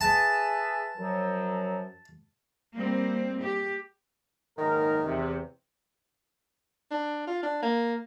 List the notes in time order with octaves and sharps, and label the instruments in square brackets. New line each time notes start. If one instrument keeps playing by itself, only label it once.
[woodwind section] G#4 B4 E5 [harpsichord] A5
[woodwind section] F#2 F3 F#3
[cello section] G3 A#3 C4
G4
[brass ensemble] F#1 G#2 A#4 [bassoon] D#3
[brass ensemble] E2 C3
[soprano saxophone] D4
F4
D4
A#3